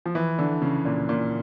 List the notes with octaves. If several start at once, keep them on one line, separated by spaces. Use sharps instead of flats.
F3
E3
D3
C#3
A#2
A#2